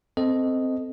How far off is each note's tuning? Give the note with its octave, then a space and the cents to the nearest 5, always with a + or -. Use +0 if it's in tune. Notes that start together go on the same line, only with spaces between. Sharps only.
C4 -5 A4 +0 D#5 +0